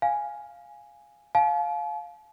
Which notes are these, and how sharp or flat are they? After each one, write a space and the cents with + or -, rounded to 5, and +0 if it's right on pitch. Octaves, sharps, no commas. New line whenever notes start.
F5 +5 G#5 +0
F5 +10 A5 -45